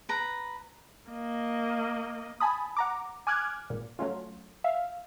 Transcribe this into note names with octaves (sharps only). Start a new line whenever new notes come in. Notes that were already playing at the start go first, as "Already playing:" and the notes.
B4 A#5
A#3 D#5
G#5 A5 B5 D#6
F#5 A#5 D6
G#5 D6 F6 F#6 G#6
G#1 A#2
F#3 A3 C#4 F4
E5 F5